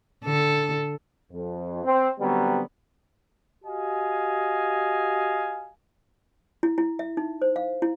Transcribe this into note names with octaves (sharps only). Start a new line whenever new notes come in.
D3 A4
F2
C4
D3 F#3 G3 B3 C4
F#4 G4 D#5 F5 G#5
E4
E4
E5
D#4
C5
F5
E4